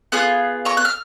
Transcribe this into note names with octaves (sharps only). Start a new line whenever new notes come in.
B3 F4 G#4 D#6 F#6
A#5 C#6
F#6
F6